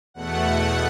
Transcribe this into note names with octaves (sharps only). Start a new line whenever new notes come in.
E2 B2 A3 F#5